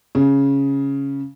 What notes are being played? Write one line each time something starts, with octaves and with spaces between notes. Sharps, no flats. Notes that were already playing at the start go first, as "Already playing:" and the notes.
C#3